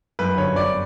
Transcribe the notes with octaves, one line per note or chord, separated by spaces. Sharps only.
F#2 B4
G1 C#5
G1 D5